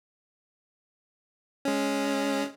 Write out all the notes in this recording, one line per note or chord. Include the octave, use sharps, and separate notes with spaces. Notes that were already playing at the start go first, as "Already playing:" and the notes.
G#3 C#4